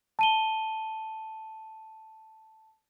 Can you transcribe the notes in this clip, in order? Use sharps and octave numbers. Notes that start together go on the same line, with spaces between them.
A5 D#7 G7